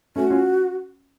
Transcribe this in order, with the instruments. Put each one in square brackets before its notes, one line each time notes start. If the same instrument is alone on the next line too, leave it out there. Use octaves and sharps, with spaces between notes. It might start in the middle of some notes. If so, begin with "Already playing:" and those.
[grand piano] A3 C#4 [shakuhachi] F#4
[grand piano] C#4 F4